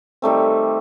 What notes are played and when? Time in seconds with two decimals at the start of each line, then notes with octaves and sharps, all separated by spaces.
0.22 D#3 G3 A3 C4